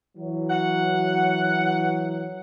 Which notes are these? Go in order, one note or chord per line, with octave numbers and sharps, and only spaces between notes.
E3 F#3
F#5